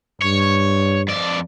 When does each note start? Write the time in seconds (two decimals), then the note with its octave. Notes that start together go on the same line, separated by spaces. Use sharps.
0.22 G2 C#5
1.08 F2 D5